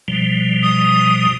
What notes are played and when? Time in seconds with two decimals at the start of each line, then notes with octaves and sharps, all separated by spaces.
0.08 B2 F3 G3
0.63 D#6